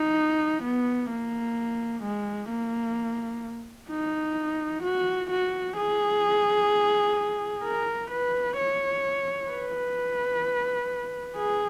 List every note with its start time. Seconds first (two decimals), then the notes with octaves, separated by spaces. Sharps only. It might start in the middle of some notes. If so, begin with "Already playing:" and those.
Already playing: D#4
0.63 B3
1.10 A#3
2.03 G#3
2.50 A#3
3.90 D#4
4.83 F#4
5.30 F#4
5.77 G#4
7.63 A#4
8.11 B4
8.57 C#5
9.50 B4
11.37 G#4